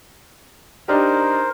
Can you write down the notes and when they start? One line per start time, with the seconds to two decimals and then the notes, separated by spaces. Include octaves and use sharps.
0.88 D4 D#4 G4 A#4 C5